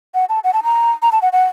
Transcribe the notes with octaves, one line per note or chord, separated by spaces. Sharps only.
F#5
A5
F#5
A5
A#5
A#5
A5
F#5
F#5